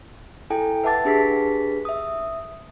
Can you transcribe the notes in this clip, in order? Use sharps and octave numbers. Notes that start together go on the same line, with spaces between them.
E4 A4 G5 G#5
B4 E5 F#5 A5 D6 A6
D4 G4 G#4 B4 B6
E5 D#6